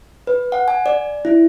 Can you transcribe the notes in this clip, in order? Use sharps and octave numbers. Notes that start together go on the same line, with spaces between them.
B4
F#5
G#5
D5
E4